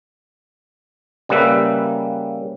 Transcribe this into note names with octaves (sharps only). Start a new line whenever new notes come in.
C#3 G3 A#3 B4 E5